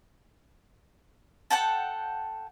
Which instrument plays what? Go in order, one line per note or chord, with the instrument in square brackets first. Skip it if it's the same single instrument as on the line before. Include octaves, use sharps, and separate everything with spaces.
[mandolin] A4 F#5 G5 A5